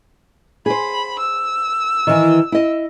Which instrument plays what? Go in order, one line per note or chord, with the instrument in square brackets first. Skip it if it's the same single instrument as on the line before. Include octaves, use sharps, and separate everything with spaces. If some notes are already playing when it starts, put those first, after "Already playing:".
[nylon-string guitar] G#4 C5 [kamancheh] B5
[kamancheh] E6
[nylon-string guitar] D#3 E3
E4 D#5